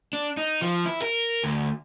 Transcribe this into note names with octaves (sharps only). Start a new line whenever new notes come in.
D4
D#4
F3
E4
A#4
D2